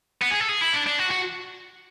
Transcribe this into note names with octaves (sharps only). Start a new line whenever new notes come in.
B3
G#4
A4
G#4
E4
D4
D4
F#4
F#4